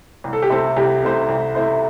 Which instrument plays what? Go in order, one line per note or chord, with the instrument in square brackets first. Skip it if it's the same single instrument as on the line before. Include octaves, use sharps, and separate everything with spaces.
[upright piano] C2
[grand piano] A4
G4
[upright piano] C3 A3 E4 C5 [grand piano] A4
[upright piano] C2 [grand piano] G4
[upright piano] C3 A3 E4 C5
C2
C3 A3 E4 C5